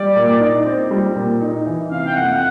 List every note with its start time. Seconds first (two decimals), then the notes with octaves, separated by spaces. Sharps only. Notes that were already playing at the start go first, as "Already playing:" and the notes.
Already playing: G3 D5
0.16 A#2
0.40 D#4
0.66 C4
0.91 G3
1.16 A#2
1.41 D#4
1.67 E3
1.91 C3 F5
2.07 G5
2.16 F2 F#5